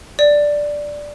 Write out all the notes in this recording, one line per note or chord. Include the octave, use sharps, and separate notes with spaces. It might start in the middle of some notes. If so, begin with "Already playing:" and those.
D5